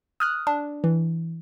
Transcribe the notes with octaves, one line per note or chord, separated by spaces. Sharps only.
D#6 F6 F#6
D4
E3